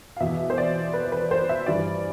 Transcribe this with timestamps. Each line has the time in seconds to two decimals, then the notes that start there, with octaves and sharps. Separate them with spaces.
0.16 F5
0.20 E2 B2 E5
0.50 C5
0.58 D5
0.93 B4
1.12 B4
1.31 C5
1.49 E5
1.66 G2 E3 D5